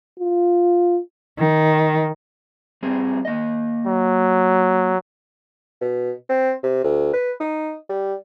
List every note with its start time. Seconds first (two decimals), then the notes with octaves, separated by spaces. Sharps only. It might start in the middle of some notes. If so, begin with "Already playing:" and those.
0.20 F4
1.40 D#3
2.83 G3 C4 G#4
3.25 A#3 D#5
3.87 F#3
5.81 B2
6.30 C4
6.64 C3
6.84 D2
7.14 B4
7.40 D#4
7.90 G3